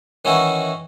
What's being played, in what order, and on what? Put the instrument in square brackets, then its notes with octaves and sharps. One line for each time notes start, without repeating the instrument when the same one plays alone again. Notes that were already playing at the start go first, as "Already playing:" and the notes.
[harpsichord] D#3 E3 C#4 E4 F#4